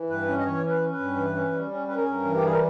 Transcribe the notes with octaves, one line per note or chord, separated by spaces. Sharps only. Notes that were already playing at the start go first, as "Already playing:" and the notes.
Already playing: E3
G2 B4
C#4
D#5
E3 C#5
C#4
B4
C#4
B4
G2
E3
C#4
G3
C#4
C#4 B4
A#4
G#4
G2 A#4
E3
G4
G3 G#4
A#4